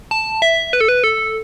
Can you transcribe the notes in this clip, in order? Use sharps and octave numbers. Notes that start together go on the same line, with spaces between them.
A5
E5
B4
A4
B4
A4